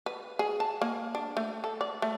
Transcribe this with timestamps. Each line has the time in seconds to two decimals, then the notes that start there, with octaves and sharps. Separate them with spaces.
0.06 B4
0.39 G#4
0.60 A5
0.82 A#3
1.15 D4
1.37 A3
1.64 A4
1.81 D5
2.02 A3